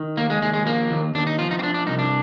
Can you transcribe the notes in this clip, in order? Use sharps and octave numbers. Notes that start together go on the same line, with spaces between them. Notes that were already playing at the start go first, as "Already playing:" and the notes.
Already playing: D#3
D#2 A#3
G#3
D#2 G#3
G#3
F3 A#3
D#2
D#2 D4
D#4
F3 F4
D#4
C4
F3 D4
D4
C2 D#4
D4